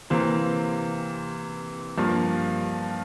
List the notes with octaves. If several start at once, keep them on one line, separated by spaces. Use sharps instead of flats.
C3 E3 A#3 C5
G2 F3 A#3